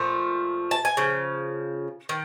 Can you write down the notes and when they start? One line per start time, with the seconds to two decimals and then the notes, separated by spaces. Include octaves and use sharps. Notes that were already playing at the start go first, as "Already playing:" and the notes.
Already playing: A#2 F3 A3
0.71 A5
0.85 G#5
0.97 C#3 F3
2.09 D#3